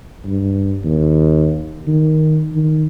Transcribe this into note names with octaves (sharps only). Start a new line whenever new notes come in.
G2
D#2
D#3
D#3